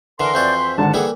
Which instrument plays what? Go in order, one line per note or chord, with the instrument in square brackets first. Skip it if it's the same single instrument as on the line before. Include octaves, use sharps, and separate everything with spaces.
[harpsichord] D3 E3 [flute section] A#4 [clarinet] C6
[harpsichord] F2 E3 F#4 [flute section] C5 D5 G6
[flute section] C5 E5
[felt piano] G#1 D3 [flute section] F#5 [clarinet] A5
[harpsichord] E3 G3 E4 [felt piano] A#3 A4 [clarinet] G#4